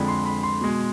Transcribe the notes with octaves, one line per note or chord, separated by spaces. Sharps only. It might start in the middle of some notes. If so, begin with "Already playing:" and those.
Already playing: F2 D3 F3 G#3 B5
C6
B5
C6
B2 G#3